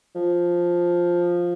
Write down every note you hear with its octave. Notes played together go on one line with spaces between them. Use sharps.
F3